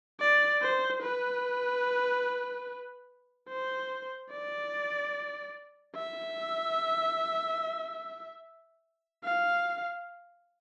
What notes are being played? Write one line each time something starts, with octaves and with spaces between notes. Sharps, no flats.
D5
C5
B4
C5
D5
E5
F5